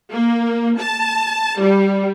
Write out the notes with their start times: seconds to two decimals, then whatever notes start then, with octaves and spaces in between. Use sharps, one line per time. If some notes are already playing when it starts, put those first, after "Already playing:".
0.10 A#3
0.78 A5
1.59 G3